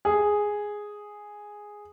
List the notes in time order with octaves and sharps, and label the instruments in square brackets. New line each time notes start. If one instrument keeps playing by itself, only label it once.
[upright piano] G#4